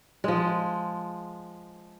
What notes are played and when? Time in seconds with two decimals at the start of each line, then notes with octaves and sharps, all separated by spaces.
0.24 F3 G#3